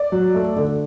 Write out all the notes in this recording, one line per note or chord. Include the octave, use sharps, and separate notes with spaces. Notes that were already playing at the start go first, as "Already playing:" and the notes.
Already playing: D5
F#3
A3
D3